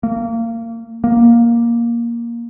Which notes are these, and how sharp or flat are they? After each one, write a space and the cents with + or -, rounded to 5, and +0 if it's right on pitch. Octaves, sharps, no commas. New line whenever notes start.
A#3 -25
A#3 +10